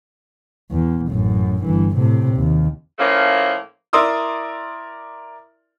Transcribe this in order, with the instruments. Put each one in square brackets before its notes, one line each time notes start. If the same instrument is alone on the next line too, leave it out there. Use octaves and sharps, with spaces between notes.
[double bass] E2
A1 F#2
G1 E3
A2 C3
D#2
[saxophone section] A2 F3 A3 A#3 C#4
[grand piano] E4 A#4 D5 C6 D#6 E6